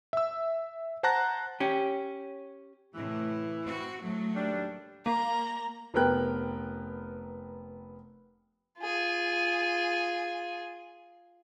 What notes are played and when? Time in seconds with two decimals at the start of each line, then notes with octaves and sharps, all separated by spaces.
0.13 E5 E6
1.03 C5 F#5 A5 A#5 F#6 A#6
1.60 C#4 G4
2.95 A2 C3 E3 E4
3.63 C4 F#4
4.01 A2 F#3 A3
4.35 D#2 G3 D4
5.06 A#3 A#5
5.94 F1 B3 A#4 G5 F#6
8.80 F4 G#4